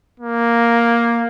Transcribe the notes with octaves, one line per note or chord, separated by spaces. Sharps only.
A#3